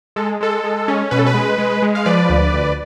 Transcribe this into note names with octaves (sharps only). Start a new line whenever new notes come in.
G#3 A4
G#3 A4
G#3
C#4
B2 B4
A4
B4
G#3
G#3
G#3
F5
F3 B4 D5
D2
D2